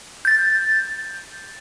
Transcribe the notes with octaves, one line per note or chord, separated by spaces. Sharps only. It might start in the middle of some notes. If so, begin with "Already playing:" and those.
G6 A6